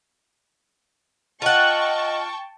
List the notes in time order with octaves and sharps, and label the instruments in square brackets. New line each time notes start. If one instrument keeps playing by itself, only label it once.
[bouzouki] F4 F#5 [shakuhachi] D#5 [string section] G5 A5 C#6